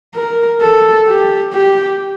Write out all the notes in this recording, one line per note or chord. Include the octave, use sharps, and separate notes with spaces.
A#4
A4
G4
G4